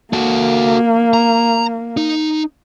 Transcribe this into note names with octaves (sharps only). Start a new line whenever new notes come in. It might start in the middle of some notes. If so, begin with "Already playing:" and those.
A#3 F#4 A4
A#5
D#4